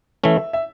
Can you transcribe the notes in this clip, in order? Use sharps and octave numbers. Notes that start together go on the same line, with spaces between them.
E3 A3 C#4 E5
E5